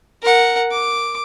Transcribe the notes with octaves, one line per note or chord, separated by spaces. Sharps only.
A#4 F#5
D6